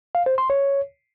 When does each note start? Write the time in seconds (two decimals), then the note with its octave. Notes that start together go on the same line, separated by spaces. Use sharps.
0.15 F5
0.26 C5
0.38 C6
0.50 C#5